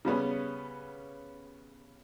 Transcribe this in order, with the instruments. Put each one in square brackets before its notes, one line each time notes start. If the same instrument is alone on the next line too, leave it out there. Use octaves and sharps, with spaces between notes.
[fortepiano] C#3 G3 B3 C#4